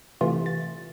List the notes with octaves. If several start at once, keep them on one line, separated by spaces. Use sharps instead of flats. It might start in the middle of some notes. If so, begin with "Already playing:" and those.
C3 E3 A3 F4
A6